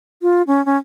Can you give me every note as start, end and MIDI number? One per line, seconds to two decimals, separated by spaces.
0.22 0.42 65
0.47 0.64 61
0.66 0.77 61